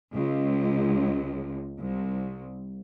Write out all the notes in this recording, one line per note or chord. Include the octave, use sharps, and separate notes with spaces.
C#2
C2